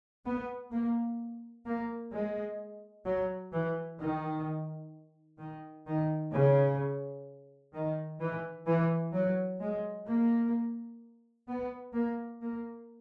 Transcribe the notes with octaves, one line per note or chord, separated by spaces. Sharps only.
B3
A#3
A#3
G#3
F#3
E3
D#3
D#3
D#3
C#3
D#3
E3
E3
F#3
G#3
A#3
B3
A#3
A#3